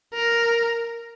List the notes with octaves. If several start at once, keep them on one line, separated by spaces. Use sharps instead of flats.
A#4